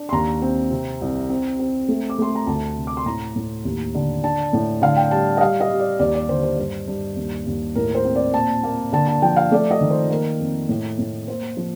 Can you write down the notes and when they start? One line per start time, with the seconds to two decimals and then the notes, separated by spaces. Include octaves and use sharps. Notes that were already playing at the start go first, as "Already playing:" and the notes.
Already playing: D4
0.09 C6
0.12 D#2 A#5
0.42 C4
0.71 C3
1.01 C2
1.29 C4
1.59 C4
1.88 A3
2.10 D6
2.19 A3 C6
2.35 A#5
2.47 D2 A5
2.76 C3
2.87 D6
2.97 C6
3.06 A2 A#5
3.36 A2
3.65 D#2
3.95 D3
4.23 D4 A5
4.53 A2
4.82 D3 F5
4.97 G5
5.11 G3 A5
5.37 D#5
5.41 G3 F5
5.60 D#5
5.70 G3
5.79 D5
5.99 D#2 D5
6.15 D5
6.29 D3 C5
6.43 C5
6.58 G2 C5
6.88 G2
7.16 D#2
7.46 D#2
7.75 A2 A#4
7.95 C5
8.05 C4
8.15 D5
8.34 A#2 A5
8.63 A#3
8.93 D3 A5
9.08 A5
9.22 F3 G5
9.36 F5
9.52 A3 D5
9.71 D#5
9.81 D#3
9.90 C5
10.10 A#3 A#4
10.40 F2
10.69 A2
10.99 A2
11.28 A#3 C5
11.57 F3